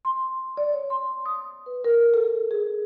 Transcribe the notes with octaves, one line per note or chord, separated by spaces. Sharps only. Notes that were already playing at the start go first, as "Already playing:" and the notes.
C6
D5
C#5
C6
D#6
B4
A#4
A4
G#4